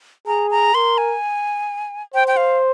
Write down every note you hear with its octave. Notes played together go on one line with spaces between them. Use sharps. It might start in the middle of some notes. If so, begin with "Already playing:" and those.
G#4 A#5
A#5
A#4 C6
G#5
C5 G5
G5
F5